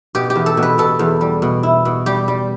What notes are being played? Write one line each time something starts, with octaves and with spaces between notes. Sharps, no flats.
B2 G4
G4
E2
A4
B2
B4
B2 A4
E2
G3
B2
E4
B2
G3 G4
G3